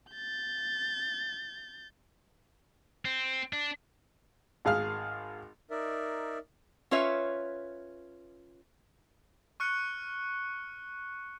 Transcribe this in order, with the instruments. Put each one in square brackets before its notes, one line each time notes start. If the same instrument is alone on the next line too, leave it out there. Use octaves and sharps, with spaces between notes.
[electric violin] G6 A6
[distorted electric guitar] C4
D4
[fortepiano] G#1 G#4 F5 F6
[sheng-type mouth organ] D#4 A#4 D5 E5
[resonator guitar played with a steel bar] C#4 F4 B4 C#5 E5
[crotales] C#6 F6 F#6 C#7